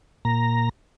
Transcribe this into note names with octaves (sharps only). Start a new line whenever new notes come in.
A#2 A#5